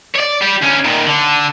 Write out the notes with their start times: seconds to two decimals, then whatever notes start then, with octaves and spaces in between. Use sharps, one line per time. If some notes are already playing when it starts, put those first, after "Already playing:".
0.16 C#5 D5
0.42 G3 G4
0.62 D2 C#4
0.85 A#2 D#3
1.07 D3